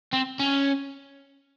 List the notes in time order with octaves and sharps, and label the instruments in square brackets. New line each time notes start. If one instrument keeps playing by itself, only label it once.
[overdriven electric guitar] C4
C#4